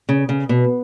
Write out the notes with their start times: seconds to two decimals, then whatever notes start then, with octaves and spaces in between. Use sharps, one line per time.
0.09 C#3
0.29 C#3
0.49 B2